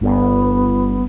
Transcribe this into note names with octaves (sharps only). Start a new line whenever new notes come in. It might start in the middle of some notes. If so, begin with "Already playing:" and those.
G1 B3